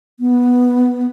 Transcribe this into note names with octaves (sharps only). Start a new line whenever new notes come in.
B3